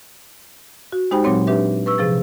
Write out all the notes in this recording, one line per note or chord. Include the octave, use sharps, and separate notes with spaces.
F#4
G#3 D#4 G4 C5 G5 B5
A#2 F#3 G#3 C4 C#5
D4 G4 B4 E5
B4 C#6 E6
C3 F3 G#4 A6